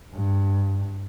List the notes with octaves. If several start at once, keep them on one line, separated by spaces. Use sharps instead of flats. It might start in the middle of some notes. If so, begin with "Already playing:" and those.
G2